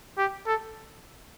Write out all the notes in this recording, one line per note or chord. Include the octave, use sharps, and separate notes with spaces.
G4
A4